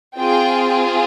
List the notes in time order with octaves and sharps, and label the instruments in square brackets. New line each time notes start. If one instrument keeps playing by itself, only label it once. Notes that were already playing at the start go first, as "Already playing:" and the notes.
[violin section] C4 F4 G#4 G5